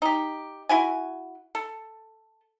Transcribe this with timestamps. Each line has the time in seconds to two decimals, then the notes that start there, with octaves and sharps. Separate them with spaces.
0.02 D#4 G4
0.69 E4 F#4 G#5
1.55 A4